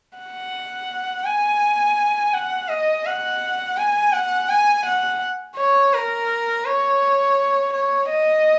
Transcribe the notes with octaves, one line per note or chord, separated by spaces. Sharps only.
F#5
G#5
F#5
D#5
F#5
G#5
F#5
G#5
F#5
C#5
A#4
C#5
C#5
D#5